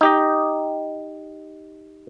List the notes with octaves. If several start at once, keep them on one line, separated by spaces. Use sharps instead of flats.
D#4 G4 D#5